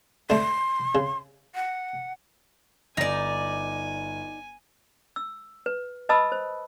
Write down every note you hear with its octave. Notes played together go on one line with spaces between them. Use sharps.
D3 A3 C6
C#3
F#5
G1 D#4 D5 G#5 A#6
E6
B4
B4 D#5 A5 B5 D#6 E6
C5